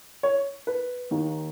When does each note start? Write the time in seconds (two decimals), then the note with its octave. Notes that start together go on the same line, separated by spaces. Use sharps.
0.23 C#5
0.67 B4
1.11 D#2 D#3 A#3